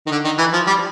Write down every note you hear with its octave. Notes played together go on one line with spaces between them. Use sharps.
D#3
D3
D#3
E3
F3
G3